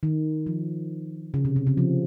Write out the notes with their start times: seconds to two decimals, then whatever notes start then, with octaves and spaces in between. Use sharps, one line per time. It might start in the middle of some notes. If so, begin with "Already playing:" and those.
0.03 D#3
0.46 F3
1.34 C#3
1.45 C3
1.56 C3
1.67 C#3
1.77 F3